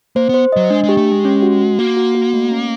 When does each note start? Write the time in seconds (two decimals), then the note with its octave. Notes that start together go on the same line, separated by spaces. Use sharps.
0.16 A#3 C5
0.29 B3 C5
0.52 F#3 D#5
0.70 G#3 D4
0.84 G#3
0.89 G4
0.97 A3
1.07 G#3 G4
1.25 C#4
1.42 F#4
1.61 F#4
1.79 A#3 F#4
1.97 F#4
2.15 F#4
2.33 A3
2.51 C#4